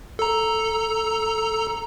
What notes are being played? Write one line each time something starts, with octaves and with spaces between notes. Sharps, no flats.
A4 A#5